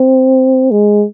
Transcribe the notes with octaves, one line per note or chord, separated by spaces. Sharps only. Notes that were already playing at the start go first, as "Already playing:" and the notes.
Already playing: C4
G#3